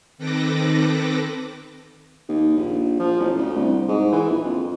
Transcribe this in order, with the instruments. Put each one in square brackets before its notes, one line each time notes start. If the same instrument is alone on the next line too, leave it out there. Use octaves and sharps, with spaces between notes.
[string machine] D#3 C4 A4 B4 D6 A#6
[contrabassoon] D#2
A#1
F3
A1
D2
C2
G#2
E3
A#1
F2